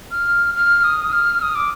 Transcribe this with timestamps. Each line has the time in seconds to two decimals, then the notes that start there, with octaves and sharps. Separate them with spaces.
0.11 F6
0.55 F6
0.84 D#6
1.12 F6
1.42 D#6
1.55 D6